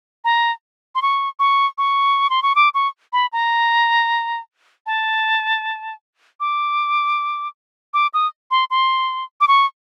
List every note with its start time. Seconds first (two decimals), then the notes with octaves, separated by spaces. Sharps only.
0.24 A#5
0.95 C6
1.02 C#6
1.39 C#6
1.78 C#6
2.30 C6
2.42 C#6
2.55 D6
2.74 C#6
3.13 B5
3.33 A#5
4.86 A5
6.40 D6
7.94 D6
8.14 D#6
8.51 C6
8.70 C6
9.41 D6
9.48 C#6